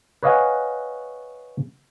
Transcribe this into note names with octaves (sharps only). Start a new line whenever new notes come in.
B4 C#5 D#5 F5 F#5 G#5